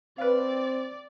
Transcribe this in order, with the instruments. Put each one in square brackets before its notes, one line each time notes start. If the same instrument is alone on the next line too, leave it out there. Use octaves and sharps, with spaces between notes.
[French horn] C4 [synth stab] B4 F5 [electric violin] D5